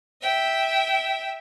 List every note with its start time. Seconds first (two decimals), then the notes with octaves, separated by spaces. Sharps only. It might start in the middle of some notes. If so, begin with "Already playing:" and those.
0.21 E5 G5